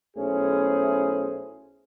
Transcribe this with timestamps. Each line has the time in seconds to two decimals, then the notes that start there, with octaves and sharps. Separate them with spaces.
0.17 B1 A3 C#4 E4 G#4 C5